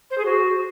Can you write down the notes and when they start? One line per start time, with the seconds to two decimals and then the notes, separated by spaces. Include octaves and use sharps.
0.10 C5
0.18 G#4
0.25 F#4